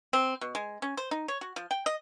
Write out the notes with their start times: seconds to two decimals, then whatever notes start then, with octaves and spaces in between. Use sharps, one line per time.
0.13 C4
0.41 B2
0.55 G#3
0.82 C#4
0.97 C5
1.11 D#4
1.28 C#5
1.41 F#4
1.56 F3
1.71 G5
1.86 D#5